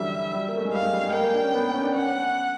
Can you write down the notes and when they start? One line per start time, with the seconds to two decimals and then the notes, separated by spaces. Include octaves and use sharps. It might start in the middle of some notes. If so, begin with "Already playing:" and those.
Already playing: D3 E3 F#3 G3 E5
0.33 G3
0.48 A#3
0.57 A3
0.65 G#3
0.73 G3 F5
0.83 G#3
0.93 G3
1.03 G#3
1.13 A#3 G5
1.24 A#3
1.34 D4
1.44 C#4
1.54 B3
1.64 A#3
1.74 C#4
1.84 D4
1.94 C#4 F#5